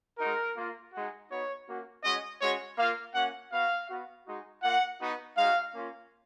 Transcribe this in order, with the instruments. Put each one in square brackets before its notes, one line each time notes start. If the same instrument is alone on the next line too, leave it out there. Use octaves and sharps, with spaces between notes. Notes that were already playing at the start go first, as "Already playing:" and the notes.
[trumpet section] G#3 D#4 F#4 A#4
A#3 F4
G#3 D#4 F#4
B3 D#4 F#4 C#5
A#3 C#4 F#4
G#3 C#4 F#4 D#5
G#3 C#4 F#4 C#5
A#3 F4 F5
A#3 C#4 F#4 F#5
B3 F#4 F5
B3 F#4
G#3 D#4 F#4
A#3 F4 F#5
B3 D#4 F#4
G#3 D#4 F#4 F5
A#3 C#4 F4